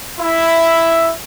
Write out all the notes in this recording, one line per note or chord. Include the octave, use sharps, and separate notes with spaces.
E4 E5